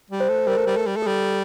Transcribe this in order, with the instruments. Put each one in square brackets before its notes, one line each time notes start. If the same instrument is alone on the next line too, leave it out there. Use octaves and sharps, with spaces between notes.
[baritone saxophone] G3
[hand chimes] C5
[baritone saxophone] A3
[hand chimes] C5
[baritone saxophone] G3 [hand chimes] A#4
[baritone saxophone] A3
G3
A3
G3
A3
[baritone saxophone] G3 [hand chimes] A4